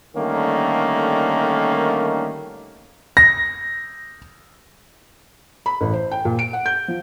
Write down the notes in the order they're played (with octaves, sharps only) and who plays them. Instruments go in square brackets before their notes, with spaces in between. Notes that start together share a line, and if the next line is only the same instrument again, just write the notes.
[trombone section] D3 D#3 G3 A3 A#3 C#4
[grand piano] A#6
[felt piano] B5
A1
C5
G5
A#2
D7
F#5
G6
F3